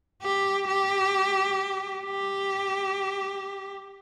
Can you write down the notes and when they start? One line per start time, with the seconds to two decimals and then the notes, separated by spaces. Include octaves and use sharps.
0.23 G4
0.68 G4
2.05 G4